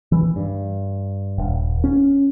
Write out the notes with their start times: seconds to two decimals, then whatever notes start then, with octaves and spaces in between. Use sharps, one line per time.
0.12 E3
0.36 G2
1.38 D#1
1.84 C#4